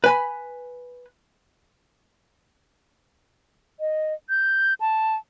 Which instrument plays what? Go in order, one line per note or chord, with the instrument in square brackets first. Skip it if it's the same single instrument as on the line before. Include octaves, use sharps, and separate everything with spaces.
[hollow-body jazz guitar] B4 G#5 B5
[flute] D#5
G6
A5